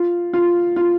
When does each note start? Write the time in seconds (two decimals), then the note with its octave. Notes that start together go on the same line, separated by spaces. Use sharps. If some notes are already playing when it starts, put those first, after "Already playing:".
Already playing: F4
0.33 F4
0.76 F4